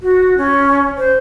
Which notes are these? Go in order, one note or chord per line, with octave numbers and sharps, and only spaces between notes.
F#4
C#4
C5